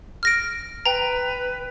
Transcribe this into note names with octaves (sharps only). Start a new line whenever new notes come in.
F6 A#6 D7
B4 G5 A#5